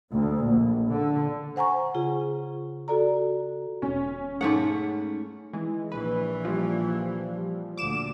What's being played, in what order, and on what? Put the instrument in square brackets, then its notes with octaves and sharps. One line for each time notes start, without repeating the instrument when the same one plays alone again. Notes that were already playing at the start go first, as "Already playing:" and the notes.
[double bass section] D2
A#1
D3
[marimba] C5 F#5 G#5 A#5 C#6
C#3 F4 G#4
F#4 A4 D5 A#5
[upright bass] E1 D#3 [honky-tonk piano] C#4
[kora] G#2 A3 F#5 [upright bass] G#3
[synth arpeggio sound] E3 G#3
[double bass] A#1 E3 [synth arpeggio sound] B4
[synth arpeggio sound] F3 G3
[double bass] D2 A#2 [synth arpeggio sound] D6 E7